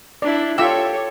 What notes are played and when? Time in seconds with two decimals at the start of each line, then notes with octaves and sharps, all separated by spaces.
0.22 D4 E4 D5
0.58 F4 G4 A4 C#5 E5 E6